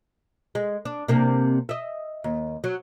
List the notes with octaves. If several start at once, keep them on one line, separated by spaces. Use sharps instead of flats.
G#3
D4
C3 A#3 D4
D#5 E5
D#2
F#3